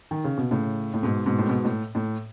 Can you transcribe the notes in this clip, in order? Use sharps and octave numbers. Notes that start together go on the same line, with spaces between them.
D#3
C#3
B2
A2 C#3
A2
G#2 B2
G#2 B2
A2
G#2 B2
A2
A2